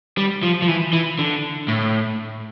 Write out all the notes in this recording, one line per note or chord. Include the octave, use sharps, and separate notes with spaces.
G3
F3
F3
E3
E3
D3
A2